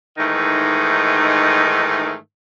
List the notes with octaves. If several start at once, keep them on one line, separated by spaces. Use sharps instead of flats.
G#2 D#3 E3 A3 D#4